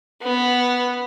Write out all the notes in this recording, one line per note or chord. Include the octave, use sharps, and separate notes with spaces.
B3